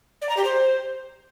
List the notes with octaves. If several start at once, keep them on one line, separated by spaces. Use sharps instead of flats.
D5
A#5
G4
C5